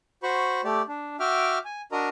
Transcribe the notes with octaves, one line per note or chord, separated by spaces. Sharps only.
F#4 C5 B5 C#6
A3 G4 D5
D4
F#4 E5 G5 D6 F6
G#5
D4 F#4 A#4 D#5 A#5